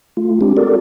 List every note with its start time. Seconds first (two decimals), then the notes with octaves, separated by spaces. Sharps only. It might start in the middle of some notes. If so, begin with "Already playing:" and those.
0.17 A3 F4
0.41 G#3 C4 D4 G4
0.57 F#4 G4 A4 A#4 D5